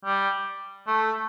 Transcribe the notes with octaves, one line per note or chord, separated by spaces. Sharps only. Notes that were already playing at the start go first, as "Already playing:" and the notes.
G3
A3